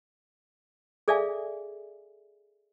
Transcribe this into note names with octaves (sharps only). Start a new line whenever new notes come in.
G#4 A4 D5 E5 F5 G#5